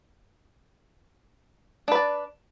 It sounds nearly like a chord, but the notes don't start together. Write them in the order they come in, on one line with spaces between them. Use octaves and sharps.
D4 B4 D5